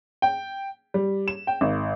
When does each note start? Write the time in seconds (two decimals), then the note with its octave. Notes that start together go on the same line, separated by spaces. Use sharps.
0.22 G5
0.94 G3
1.28 E7
1.47 G5
1.61 G#1